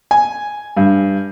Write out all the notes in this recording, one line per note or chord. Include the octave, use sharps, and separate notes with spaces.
G#5
G2